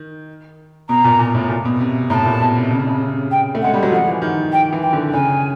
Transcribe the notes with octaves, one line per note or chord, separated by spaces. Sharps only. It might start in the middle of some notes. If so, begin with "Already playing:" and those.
Already playing: D#3
B2 A#5
A#2
A#2
A2
A#2
B2
C3
A2 A#5
A5
A#2
B2
C3
C#3
C3
C#3
G5
A3
G#3 F#5
G3
F#3
F3 F#5
E3
D#3
G5
E3
G5
D3
C#3 G#5